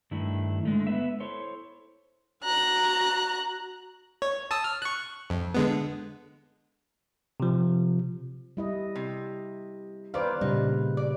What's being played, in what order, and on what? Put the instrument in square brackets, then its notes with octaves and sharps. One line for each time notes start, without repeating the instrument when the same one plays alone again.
[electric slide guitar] G2 D#3 A3 D4 E4
D3 G#3 A3
B3 B4 E5
E4 A4 C5 C#5
[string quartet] F#4 A#5 F#6
[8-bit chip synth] C#5
A5 D#6 E6
F6
C#6 F#6
F2
D3 G#3 B3
[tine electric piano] C3 F3
[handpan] G3 E4 D#5
[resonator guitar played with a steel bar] C3
[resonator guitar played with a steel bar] D#3 D5 [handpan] B4 C5 F5
[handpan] A#2 C#3 G3 [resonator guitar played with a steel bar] D#4
[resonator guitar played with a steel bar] D5